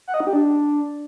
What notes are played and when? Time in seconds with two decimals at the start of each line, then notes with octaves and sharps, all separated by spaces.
0.08 F#5
0.14 D#5
0.20 D#4
0.27 G4
0.33 D4